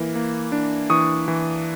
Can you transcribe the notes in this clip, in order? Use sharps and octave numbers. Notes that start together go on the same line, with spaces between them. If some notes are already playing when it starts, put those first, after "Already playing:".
Already playing: E3 A#3
A#3
D4
E3 C#6 D#6
E3